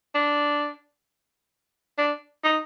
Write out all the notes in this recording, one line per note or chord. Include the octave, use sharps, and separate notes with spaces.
D4
D4
D#4